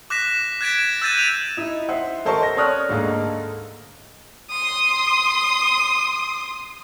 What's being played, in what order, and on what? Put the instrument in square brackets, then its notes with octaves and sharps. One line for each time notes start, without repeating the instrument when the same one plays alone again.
[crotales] D6 F#6 A#6 B6 E7
F#6 G#6 A6 B6 D7 E7
E6 F#6 G6 A6 D#7 E7
D#7 F7
[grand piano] D#4 E4
C5 E5 F#5
A4 A#4 C5 D#5 A5 C#6
A#6
C#5 D5 C#6 D#6 F6 F#6
D2 G#2 A#3 D#4 A4
[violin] C6 D#6